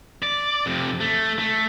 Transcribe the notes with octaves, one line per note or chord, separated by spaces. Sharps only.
D5
F2 C3
A3
A3